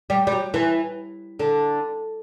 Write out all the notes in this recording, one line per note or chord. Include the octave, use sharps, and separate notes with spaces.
G3
G3
F#3
E3
D3